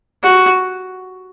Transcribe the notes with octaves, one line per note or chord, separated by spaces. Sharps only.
F#4